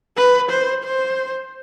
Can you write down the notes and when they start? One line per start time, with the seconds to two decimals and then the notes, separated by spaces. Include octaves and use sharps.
0.17 B4
0.50 C5
0.84 C5